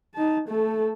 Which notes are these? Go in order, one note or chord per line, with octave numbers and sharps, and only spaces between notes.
D#4 A5
A3 A4